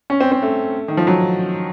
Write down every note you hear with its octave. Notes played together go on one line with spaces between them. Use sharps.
C#4
C4
C4
A3
D#3
F3
F#3